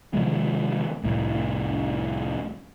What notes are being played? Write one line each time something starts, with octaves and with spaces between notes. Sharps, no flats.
C3 D#3 F3 G#3
C2 F2 A2